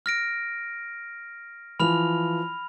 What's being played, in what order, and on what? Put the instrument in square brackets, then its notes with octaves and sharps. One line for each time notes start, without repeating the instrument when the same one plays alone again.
[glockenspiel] F6 A#6 D7
[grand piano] E3 F3 [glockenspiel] B5 F6 F7